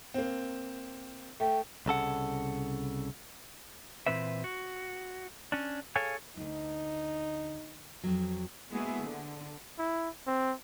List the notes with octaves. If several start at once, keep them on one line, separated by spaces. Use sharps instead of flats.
A#3 C4
A3 G5
C2 C#3 A4 F#5
A#2 E3 C4 B4 E5
F#4
C#4 D4
G#4 A4 C#5 F5 G#5
D2 G2 D#4
F2 F#3
G#3 A#3 B3 E4 F#4 G#4
D3
E4
C4